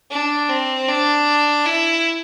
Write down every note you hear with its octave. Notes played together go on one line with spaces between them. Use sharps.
D4
C4
D4
E4